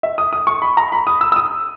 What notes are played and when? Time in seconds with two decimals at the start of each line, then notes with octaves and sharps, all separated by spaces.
0.03 E5
0.18 D#6
0.33 D#6
0.47 C#6
0.62 B5
0.77 A#5
0.92 B5
1.07 D#6
1.21 E6
1.32 E6
1.36 D#6